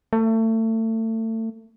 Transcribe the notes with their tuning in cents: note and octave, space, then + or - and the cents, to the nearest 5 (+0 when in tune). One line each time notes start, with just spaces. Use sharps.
A3 +30